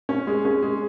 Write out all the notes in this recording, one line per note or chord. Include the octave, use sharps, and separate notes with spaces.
C#4
G#3
C#4
G#3